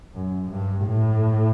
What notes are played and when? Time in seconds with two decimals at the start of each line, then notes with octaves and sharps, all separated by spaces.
0.14 F#2
0.50 G2
0.86 A2